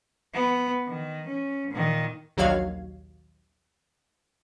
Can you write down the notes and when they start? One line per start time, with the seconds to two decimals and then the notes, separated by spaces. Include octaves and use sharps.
0.34 B3
0.87 D#3
1.26 C#4
1.71 A#2 D#3
2.37 A#1 D#2 F#3 F#4 F5 G#6